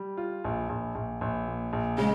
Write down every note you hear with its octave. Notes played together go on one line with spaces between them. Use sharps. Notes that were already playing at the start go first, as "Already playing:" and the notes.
Already playing: G3
F4
A#1
A#1
A#1
A#1
A#2
A#1
C#3 G#3